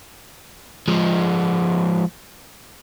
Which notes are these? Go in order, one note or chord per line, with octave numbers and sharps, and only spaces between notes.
F3 G#3